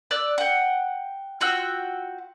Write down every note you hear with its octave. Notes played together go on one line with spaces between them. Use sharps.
D5 E6 F#6
F#5 G5
F4 F#4 G5 E6